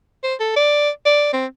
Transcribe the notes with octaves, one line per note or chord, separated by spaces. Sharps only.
C5
A4
D5
D5
C4